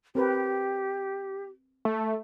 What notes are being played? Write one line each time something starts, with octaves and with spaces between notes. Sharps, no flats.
C4 G4 A#4 B4
A3